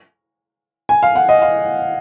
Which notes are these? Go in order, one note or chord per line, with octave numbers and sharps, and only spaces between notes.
G#5
F5
F#5
D#5
F5